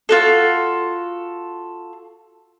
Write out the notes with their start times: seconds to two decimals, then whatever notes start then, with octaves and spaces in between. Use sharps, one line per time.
0.09 F4 F#4 A4